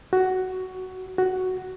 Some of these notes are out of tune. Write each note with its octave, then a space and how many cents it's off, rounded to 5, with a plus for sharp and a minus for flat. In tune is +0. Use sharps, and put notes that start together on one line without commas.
F#4 +10
F#4 +5